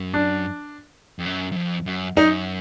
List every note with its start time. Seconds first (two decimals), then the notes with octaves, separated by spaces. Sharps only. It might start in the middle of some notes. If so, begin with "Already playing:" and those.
Already playing: F#2
0.14 D4
1.19 F2
1.26 F#2
1.52 F#2
1.56 F2
1.86 F#2
2.16 F#2 D#4